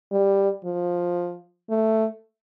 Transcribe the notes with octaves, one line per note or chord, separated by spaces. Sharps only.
G3
F3
A3